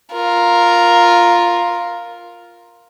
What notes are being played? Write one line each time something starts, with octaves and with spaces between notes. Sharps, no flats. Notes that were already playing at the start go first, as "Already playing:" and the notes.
F4 A#4